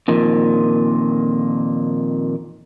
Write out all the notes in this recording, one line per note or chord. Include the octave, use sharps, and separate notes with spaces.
F2 A#2 D#3